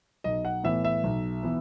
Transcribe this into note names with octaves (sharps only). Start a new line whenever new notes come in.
B1 D#5
F#5
A2 E3 B3 E5
E5
B1
E3 B3